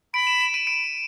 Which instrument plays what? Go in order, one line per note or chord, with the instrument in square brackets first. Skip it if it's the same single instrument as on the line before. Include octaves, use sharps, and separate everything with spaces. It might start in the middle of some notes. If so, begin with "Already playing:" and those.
[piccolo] B5 [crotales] D7
[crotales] E7
E7
D#7
D7